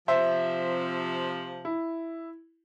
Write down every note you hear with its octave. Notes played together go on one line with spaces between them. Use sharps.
C3 F3 C5 E5
E4